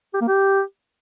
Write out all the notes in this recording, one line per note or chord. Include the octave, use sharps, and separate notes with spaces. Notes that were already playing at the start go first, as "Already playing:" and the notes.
G4
A#3
G4